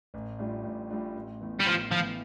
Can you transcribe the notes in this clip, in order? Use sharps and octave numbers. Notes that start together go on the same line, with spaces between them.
A1
A2 G3 D4 F4
A1
A2 G3 D4 F4
A1
A2 E3 B3
G3
A1 F3
A2 E3 F3 B3